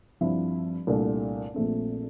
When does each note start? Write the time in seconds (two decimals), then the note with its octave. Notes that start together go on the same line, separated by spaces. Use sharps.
0.21 G2 F3 C4 E4
0.87 C2 A#2 A3 D4 A4
1.54 A#1 A#2 A3 C4